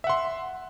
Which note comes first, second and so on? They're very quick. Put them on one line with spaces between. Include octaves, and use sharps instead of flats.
E5 F#5 C6